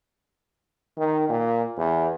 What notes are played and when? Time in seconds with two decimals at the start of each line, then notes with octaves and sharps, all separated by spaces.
0.97 D#3
1.29 A#2
1.77 E2